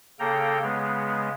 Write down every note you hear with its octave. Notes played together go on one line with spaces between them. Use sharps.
C#3 A#3 A4 G5 A#5
C#3 G#3 B3